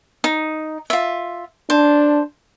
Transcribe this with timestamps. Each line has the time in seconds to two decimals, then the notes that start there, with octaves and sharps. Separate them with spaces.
0.24 D#4
0.90 F4 E5
1.70 D4 C5 A5